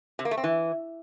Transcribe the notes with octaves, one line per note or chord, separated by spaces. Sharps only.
C3
A#3
A3
C4
E3